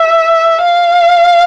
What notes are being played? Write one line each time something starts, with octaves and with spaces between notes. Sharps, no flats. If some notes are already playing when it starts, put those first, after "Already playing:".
Already playing: E5
F5